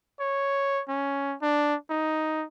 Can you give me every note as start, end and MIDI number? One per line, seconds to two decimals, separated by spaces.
0.20 0.82 73
0.88 1.36 61
1.42 1.75 62
1.90 2.45 63